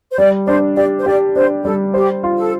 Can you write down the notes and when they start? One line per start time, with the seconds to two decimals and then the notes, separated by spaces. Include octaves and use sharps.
0.12 C5
0.18 G3 D5
0.47 D4 C5
0.76 G4 D5
0.99 C5
1.06 G4 D5
1.36 D4 C5
1.64 G3 A4
1.94 G4 C5
2.23 F4
2.38 A4